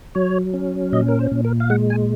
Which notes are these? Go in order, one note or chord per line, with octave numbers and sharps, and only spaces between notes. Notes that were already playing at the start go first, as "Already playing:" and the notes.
F#3 C#5
C#4
A#2 D#5
A#4
C5
A#2
A#4
F5
G#3 F#5
G#5